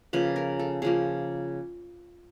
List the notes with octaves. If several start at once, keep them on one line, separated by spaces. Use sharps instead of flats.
C#3 F3 A#3 B4
A#4
A4
C#3 F3 A#3 G#4